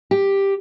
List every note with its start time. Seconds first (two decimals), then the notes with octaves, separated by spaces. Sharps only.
0.11 G4